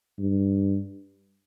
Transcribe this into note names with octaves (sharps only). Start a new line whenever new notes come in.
G2